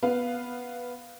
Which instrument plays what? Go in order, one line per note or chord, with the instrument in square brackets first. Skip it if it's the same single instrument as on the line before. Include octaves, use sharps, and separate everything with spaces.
[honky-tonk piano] B3 B4 F5